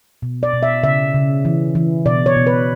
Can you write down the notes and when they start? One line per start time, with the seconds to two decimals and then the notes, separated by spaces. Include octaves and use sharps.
0.22 B2
0.43 D5
0.53 B2
0.63 E5
0.83 C#3 E5
1.14 C#3
1.45 E3
1.75 E3
2.06 B2 D5
2.26 C#5
2.36 B2
2.47 B4